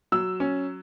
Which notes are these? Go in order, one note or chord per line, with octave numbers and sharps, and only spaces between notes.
F#3 E6
C#4